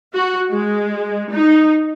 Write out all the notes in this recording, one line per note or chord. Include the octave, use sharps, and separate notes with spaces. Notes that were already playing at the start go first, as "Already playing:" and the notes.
F#4
G#3
D#4